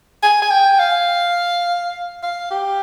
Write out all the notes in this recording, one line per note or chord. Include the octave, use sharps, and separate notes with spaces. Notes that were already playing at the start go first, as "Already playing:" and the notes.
G#5
G#5
G5
F5
F5
G4